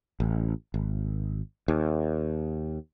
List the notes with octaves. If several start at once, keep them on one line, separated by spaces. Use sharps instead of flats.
A1
G#1
D#2